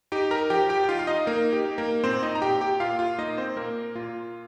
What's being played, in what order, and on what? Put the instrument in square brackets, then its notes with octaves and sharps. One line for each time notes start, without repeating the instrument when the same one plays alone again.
[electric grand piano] D#4 G4 G5
A#4 A#5
F3 G4 G5
G4 G5
G5
D#4 F4 F5
F5
D#4 D#5
A#3 D#4 A#4
G4
D#4
A#3 A#4
A#2 C4 C5
D#4 D#5
A#5
A#2 G4 G5
G4 G5
A#2 F4 F5
F4 F5
A#3 D#4 D#5
C4 C5
A#2 A#3 A#4
A#2 F4